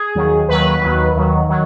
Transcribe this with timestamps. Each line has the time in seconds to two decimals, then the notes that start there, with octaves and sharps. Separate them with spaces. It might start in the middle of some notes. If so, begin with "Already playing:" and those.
Already playing: G#4
0.15 D#2 D#3 F#3
0.49 D#2 D#3 F#3 B4
0.82 D#2 D#3 F#3
1.15 D#2 D#3 F#3
1.49 D#3 F#3